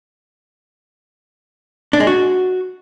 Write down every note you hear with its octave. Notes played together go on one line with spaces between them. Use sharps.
D4
G#3
F#4